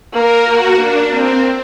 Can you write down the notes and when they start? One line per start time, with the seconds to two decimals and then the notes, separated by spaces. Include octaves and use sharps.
0.13 A#3 A#4
0.45 F#4
0.77 A#3 D4
1.09 A#3 C4